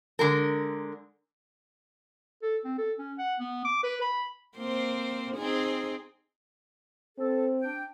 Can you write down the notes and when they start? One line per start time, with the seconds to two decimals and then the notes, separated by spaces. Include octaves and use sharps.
0.19 D3 G#3 A#4
2.42 A4
2.64 C4
2.78 A4
2.98 C#4
3.18 F#5
3.40 B3
3.65 D6
3.83 B4
4.02 B5
4.57 A#3 C4 C5
5.35 C4 D#4 G#4
7.18 C4 A4
7.61 D4 G5